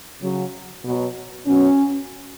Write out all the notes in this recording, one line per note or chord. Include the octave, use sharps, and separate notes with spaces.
C#3 F#3
B2 F#3
B2 F#3 C#4